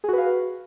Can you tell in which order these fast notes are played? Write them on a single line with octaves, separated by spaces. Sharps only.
G#4 F#4 B4 F5